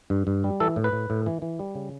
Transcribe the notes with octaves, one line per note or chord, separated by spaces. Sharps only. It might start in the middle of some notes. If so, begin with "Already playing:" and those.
G2
G2
G3
E3 A4
A2
B4
A2
A2
E3
E3
G3
C#3